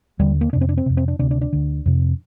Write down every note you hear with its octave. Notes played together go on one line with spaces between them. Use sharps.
D#2 D3 G3
A#3
F2 C3 D4
C4
D4
C4
F2 C3
C4
D4
D2 C3 D4
D4
D4
D2 D3
F2 C3